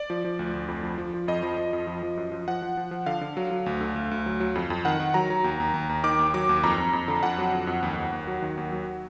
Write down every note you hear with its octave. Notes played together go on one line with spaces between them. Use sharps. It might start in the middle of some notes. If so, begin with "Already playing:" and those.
Already playing: D5
F3
F3
D2
D2
F2
F3
F3
F3
F2 D#5
F3
F3
F2
F3
F3
F#2
F3
F3 F#5
F3
F3
F3
D3 F5
D3
F#3
F#3
D2
D3
D2
D2
F#3
F#3
F2
F2
D#3 F#5
D#3
F#3 A#5
F#3
D#2
D#2
D#2
D#2
D#3 D6
D#2
F#3 D6
D#2
F2 A#5
F2
F2
D3
F2 F#5
F#3
F2
F2
D#2
D#2
D#2
F#3
D#3
D#2
F#3